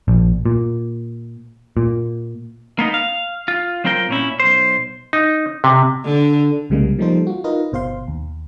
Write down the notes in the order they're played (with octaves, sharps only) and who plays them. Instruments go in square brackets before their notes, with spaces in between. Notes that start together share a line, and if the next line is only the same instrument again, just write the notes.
[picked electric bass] A#1
A#2
A#2
[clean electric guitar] A#3 B3 D#4
F5
F4
F#3 C4 F4 A#4 G5
A#2 C#4 E4
B1 C5
[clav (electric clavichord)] D#4
C3
[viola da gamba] D3
[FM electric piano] C2 C#3 G3 G#3 A#3
F3 G3 A#3 D#4 A4 C5
F4 F#4
D#4 F4 A#4 B4 D#5
G1 B2 C5 F5 C6
D#2